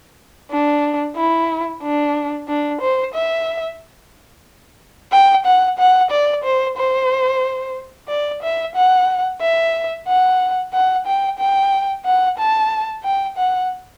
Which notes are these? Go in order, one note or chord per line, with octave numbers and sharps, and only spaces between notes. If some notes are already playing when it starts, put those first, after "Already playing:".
D4
E4
D4
D4
C5
E5
G5
F#5
F#5
D5
C5
C5
D5
E5
F#5
E5
F#5
F#5
G5
G5
F#5
A5
G5
F#5